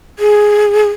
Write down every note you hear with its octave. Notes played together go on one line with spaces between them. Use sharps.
G#4